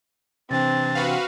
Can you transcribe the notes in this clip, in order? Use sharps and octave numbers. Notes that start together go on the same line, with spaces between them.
C3 E3 C4 D4 A6
F#4 B4 F5